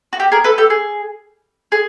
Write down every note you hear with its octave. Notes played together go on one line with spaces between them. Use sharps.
F#4
G4
G#4 A#4
A4 B4
G4 A4
G#4
G#4